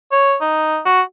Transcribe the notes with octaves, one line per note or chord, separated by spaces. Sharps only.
C#5
D#4
F#4